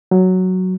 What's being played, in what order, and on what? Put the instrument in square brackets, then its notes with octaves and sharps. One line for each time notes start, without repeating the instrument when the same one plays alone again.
[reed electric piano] F#3